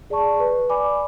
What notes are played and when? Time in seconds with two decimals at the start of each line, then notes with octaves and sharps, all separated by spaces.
0.10 G#4 D5 A5 C#6
0.40 B4
0.70 D5 G#5 B5 D6